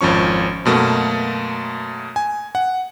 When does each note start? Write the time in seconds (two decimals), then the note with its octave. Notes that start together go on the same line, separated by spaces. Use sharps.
0.01 G#1 F2 F3 C#4 C#6
0.65 F#2 B2 A3 A#3
2.16 G#5
2.55 F#5